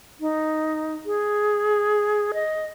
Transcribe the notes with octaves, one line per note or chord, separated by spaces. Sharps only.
D#4
G#4
D#5